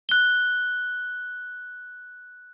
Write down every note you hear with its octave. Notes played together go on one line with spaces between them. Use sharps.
F#6 G7